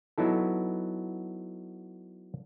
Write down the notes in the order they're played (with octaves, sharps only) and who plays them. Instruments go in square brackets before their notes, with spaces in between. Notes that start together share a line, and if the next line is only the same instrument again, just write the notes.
[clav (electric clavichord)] F#3 B3 D#4 E4 A4